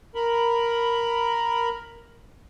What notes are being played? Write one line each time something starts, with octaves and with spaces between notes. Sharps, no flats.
A#4 B5